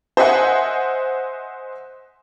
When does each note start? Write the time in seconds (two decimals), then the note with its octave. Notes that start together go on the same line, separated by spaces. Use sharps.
0.17 C5 D#5 E5 F#5 G#5